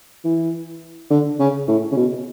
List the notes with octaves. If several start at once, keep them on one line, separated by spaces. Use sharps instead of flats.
E3
D3
C#3
A2
C#3
B2